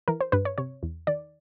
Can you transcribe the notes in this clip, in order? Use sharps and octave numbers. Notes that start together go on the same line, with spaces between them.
E3 A#4
C5
G2 B4
C#5
C3 C#5
E2
D#3 D5